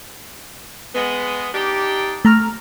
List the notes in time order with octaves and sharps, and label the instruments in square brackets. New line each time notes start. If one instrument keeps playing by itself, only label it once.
[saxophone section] G#3 B3
D4 D#4 G4
[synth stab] A3 A#5 F6